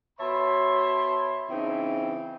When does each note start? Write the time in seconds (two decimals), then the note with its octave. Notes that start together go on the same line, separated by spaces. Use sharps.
0.19 B2 C#5 E5 A5 B5 C6
1.49 C#3 E3 C4 D#4 E5